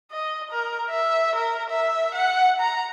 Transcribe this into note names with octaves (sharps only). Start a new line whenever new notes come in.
D#5
A#4
E5
A#4
E5
F#5
A#5